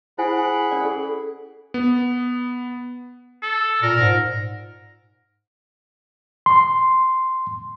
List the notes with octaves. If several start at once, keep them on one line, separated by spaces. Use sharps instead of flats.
E4 G#4 C5 F#5 G#5 B5
G#5
C#4 A#4 D5
G#4 A4
B3
A4
A#2 A#4
G#2
C6